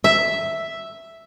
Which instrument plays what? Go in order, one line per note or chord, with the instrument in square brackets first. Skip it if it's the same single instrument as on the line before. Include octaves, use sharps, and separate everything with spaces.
[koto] E5